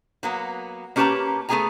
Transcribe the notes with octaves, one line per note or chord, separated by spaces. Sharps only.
F#3 A#3 B3
A#3 C#4 G4 B4 A5 A#5
A3 B3 G4 G#4 G#5 A#5